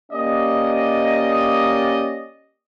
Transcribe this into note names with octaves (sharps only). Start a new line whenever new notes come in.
A#3 C#4 G4 D5 D#5